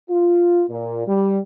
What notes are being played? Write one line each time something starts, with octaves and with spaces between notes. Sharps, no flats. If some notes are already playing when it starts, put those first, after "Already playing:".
F4
A#2
G3